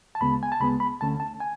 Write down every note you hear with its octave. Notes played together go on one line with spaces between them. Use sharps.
A5
D2 C#3 G#3 B3 B5
G#5
A5
D2 C#3 G#3 B3 B5
B5
D2 D3 A3 C#4 A5
A5
G#5